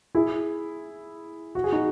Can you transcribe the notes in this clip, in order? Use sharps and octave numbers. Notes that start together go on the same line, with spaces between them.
E4 G#4
F#4
G#4
D#4 F#4